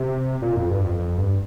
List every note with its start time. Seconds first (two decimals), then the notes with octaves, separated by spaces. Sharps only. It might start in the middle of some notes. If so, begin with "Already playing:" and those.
Already playing: C3
0.42 A#2
0.56 F2
0.70 G2
0.84 F2
0.99 F2
1.18 G2